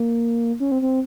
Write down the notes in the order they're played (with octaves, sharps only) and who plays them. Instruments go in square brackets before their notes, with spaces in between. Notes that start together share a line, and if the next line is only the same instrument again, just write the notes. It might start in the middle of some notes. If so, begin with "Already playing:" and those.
Already playing: [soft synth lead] A#3
C#4
C4
C4